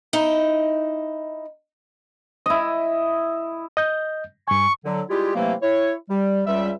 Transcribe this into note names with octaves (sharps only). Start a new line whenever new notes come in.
D#4 E4 D#5
E4 D#5
D#5 G6
G2 G#5 C#6
D3 F#3
G3 G#3 E4 F4 G4
C3 E3 F#3 A3 A#3
E4 C#5
G3
C#2 G3 E5